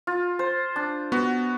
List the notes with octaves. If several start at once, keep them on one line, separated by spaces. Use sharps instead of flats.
F4
C5
D4
B3 F#4